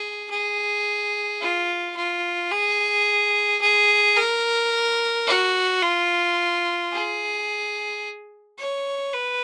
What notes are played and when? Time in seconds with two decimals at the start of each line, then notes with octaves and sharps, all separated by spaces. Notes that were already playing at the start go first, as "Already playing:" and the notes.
Already playing: G#4
0.31 G#4
1.41 F4
1.96 F4
2.51 G#4
3.61 G#4
4.17 A#4
5.27 F#4
5.82 F4
6.92 G#4
8.58 C#5
9.13 B4